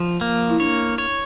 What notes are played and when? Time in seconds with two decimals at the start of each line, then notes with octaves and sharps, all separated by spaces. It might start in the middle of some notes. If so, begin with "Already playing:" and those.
Already playing: F3
0.21 A#3
0.50 E4
0.60 D4 C#5
0.98 C#5